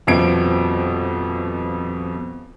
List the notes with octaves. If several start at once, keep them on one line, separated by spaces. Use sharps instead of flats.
D#1 F2 B2 F3 G#6 D7